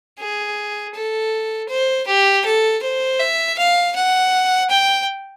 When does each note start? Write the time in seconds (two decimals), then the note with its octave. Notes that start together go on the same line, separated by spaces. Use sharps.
0.19 G#4
0.95 A4
1.69 C5
2.07 G4
2.45 A4
2.83 C5
3.20 E5
3.58 F5
3.96 F#5
4.70 G5